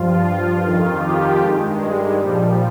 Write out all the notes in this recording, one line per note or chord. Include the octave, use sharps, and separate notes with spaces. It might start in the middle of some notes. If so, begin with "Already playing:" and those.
Already playing: G2 F3 F4
F2 D#3
G4
G2 D#3 G#3
G3
A#2 F3